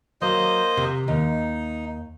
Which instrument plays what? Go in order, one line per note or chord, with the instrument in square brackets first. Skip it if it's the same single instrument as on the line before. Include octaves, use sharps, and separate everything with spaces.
[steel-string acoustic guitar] F#3 [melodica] A#3 C5 D#5
[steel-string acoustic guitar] C3
[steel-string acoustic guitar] D#2 [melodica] D#4